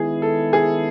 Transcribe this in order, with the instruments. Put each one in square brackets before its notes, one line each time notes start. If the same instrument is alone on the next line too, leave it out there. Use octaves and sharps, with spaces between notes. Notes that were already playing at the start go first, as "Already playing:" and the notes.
Already playing: [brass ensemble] D#3 G#3 B3 E4 [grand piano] G#4
[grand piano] A4
G#4